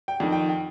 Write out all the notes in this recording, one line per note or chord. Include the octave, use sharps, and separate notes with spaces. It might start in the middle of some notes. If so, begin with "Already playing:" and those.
G5
F2 D#3
G5
G5